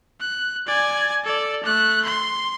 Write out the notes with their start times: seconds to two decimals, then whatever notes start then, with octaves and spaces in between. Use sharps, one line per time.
0.20 F#6
0.67 D5 G#5
1.25 A4 D5
1.64 A3 F#6
2.05 C6